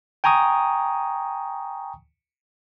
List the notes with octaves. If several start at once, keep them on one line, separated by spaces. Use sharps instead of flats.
G5 G#5 A#5 C#6 D#6